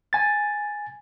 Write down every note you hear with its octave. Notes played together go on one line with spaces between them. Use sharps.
G#5 A6